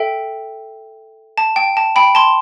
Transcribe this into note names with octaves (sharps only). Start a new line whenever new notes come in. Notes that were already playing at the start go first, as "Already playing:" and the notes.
Already playing: A4 E5 G5
A5
G5
A5
G5 B5
A5 C6